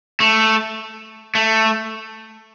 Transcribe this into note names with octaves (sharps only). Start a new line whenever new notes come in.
A3
A3